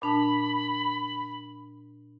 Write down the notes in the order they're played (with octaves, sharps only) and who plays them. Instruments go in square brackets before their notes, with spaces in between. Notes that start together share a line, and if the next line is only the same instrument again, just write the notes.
[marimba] A#2 D4 A5 [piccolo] B5